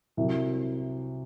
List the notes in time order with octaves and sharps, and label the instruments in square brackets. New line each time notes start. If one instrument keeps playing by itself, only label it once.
[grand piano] C2 C3 F#3